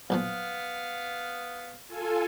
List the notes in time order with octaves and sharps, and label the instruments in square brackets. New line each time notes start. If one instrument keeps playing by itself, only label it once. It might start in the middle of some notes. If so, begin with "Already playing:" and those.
[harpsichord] B1 A#2 F3 [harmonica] B3 F5
[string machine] F4 A4 G#5